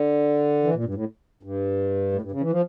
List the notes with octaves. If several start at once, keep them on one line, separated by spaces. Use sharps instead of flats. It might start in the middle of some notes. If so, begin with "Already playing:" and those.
Already playing: D3
E3
A#2
G2
A2
G2
A2
G2
C#3
E3
F3